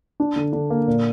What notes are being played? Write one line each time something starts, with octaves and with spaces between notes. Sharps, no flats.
D4
D3
D3
A#3
A#2